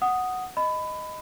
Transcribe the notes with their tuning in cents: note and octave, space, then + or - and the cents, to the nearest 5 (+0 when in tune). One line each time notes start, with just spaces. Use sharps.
F#5 +0 D#6 +0
D#5 +0 B5 +20